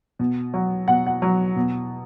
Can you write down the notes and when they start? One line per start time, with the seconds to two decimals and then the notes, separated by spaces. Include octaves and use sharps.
0.19 B2
0.54 F#3
0.88 B2 F#5
1.07 F#5
1.22 F#3
1.56 B2